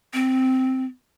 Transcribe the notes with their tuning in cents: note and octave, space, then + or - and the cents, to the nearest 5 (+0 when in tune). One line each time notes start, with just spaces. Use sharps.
C4 -5